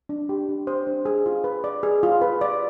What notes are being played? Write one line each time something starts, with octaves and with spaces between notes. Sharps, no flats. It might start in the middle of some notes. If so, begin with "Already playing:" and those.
D4
G4
D4
C5
D4
G#4
F4
B4
D5
G#4
F4
B4
D5